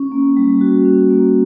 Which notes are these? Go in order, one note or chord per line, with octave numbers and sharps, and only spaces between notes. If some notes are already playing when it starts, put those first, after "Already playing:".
Already playing: C#4
A#3
G3
F#4
C#4
A#3